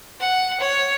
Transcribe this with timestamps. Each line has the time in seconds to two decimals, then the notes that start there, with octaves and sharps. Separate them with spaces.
0.20 F#5
0.60 C#5